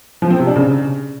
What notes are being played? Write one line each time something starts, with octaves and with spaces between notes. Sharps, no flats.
F3
C4
C3
D4
C#3